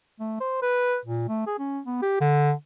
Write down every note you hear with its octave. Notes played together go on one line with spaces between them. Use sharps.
A3
C5
B4
A#2
A3
G#4
C#4
B3
G4
D3